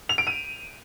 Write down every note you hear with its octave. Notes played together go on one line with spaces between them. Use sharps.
F7
D7
D#7